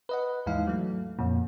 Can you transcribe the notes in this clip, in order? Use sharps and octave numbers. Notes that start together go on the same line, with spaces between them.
B4 D#5 F#5
D#2 G#2 E3 D#4 F5
F#3 A3
F2 A#2